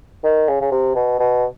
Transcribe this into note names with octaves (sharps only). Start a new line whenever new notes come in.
D#3
C#3
C#3
C3
B2
B2